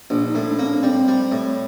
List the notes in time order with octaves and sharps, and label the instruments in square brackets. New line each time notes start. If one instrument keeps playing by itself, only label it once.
[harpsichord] A#1 [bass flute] D4
[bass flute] D#4
[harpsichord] A2
[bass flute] D4
[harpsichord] A#3 [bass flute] C4
[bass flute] D4
D4
[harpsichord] G3 [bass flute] C4
[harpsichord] G3
A2